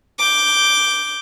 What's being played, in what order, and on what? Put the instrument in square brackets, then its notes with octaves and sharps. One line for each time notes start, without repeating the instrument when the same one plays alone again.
[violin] D6 G6